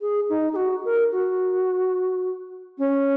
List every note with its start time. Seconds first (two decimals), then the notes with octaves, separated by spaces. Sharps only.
0.01 G#4
0.29 D#4
0.53 G#4
0.56 F#4
0.85 A#4
1.12 F#4
2.78 C#4